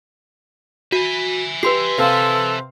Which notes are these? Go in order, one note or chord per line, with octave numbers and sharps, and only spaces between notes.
F#4 E5 G#5
G4 B4 C6 C7
C3 C4 A4 F5